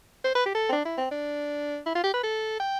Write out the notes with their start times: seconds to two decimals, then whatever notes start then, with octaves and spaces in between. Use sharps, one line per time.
0.24 C5
0.35 B4
0.46 G4
0.55 A4
0.69 C4
0.73 D4
0.85 E4
0.98 C4
1.11 D4
1.86 E4
1.95 F4
2.03 G4
2.14 B4
2.23 A4
2.60 G5